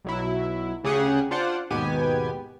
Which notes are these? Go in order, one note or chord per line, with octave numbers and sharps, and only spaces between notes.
B1 F#3 E4
D2 C#3 G4 G#4 F#5
D4 F4 C5 D5 F#5
D#2 G#2 B2 B3 G4 G#5